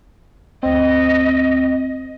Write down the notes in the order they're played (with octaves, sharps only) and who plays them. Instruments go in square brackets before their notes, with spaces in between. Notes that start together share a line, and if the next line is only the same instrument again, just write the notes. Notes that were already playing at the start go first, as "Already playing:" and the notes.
[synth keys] D2 C4 [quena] D#5